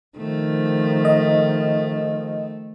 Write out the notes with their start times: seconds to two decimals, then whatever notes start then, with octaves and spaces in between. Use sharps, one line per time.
0.17 D#3 F3 A3
1.05 D#5